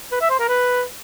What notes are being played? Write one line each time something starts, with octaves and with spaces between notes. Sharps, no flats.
B4
E5
C5
A#4
B4